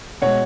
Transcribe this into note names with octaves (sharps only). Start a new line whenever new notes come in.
B2 G#3 C#5 F#5